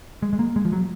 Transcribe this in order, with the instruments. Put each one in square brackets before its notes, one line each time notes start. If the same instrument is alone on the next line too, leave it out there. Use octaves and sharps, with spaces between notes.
[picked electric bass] G#3
G#3
A#3
G#3
F3
F#3